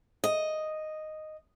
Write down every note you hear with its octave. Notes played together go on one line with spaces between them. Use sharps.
D#5